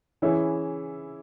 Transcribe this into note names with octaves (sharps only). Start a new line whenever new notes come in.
E3 C#4 E4 G#4